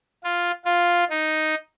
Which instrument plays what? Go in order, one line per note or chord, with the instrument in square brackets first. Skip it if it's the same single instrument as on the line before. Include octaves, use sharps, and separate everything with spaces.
[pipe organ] F4
F4
D#4